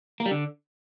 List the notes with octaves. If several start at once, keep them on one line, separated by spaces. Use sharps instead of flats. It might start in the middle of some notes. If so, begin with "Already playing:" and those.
A#3
G3
D3